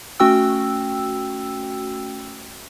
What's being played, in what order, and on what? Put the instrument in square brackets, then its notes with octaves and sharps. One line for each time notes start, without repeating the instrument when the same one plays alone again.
[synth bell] A3 C#4 F#4 G5 E6